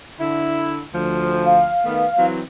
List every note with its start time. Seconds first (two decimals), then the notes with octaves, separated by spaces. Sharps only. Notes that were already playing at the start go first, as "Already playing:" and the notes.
0.20 D3 E4
0.94 D2 F3
1.45 F5
1.85 D#3 A3 B3
2.18 E3 F#3 C4